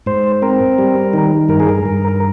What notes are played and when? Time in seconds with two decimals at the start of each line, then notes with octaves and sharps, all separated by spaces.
0.06 G#2 C5
0.42 C4 A#4
0.78 G3
1.13 D#3
1.49 G2 A#4
1.60 G#4
1.69 A#4
1.85 G2
2.08 A#4